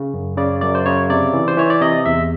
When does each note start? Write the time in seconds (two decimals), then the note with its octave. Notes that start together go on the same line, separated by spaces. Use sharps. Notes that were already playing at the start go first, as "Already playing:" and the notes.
Already playing: C#3
0.14 F#2
0.37 C#3 D5
0.61 F#2 D5
0.75 C5
0.86 C#3 C#5
1.10 C3 D5
1.33 E3
1.48 C5
1.57 E3 C#5
1.70 D5
1.81 C3 D#5
2.05 E2 E5